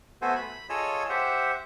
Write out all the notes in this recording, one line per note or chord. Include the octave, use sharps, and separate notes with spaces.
A3 B3 F#4 A4 C5 G#5
B5
F4 G#4 A4 C#5 D#5 E6
G4 C5 E5 F#5